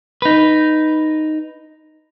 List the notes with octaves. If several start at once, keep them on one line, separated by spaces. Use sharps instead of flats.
D#4 B4